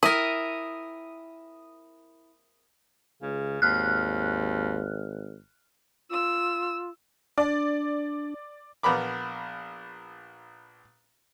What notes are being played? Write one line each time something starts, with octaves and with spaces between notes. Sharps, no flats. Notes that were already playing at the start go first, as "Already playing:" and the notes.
E4 A#4 D#6
C#2 C#3
G#1 D#2 F6 F#6
F4 E6
D4 D5
A#1 B3 A#4 B5 D6